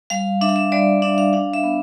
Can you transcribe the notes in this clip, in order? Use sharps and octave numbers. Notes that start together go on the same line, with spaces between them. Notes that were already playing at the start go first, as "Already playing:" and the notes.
G3 F5
D4 E5
F5
E5
G3 D5
D4 E5
F5
D4 F5
E5
B3